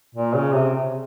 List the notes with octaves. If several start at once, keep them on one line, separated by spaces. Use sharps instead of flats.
A#2
C#3
C3